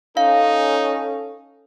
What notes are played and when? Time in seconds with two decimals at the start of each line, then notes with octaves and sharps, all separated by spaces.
0.17 C#4 D#4 A4 F5